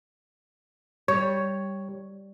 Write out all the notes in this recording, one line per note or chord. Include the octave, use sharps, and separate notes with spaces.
G3 C#5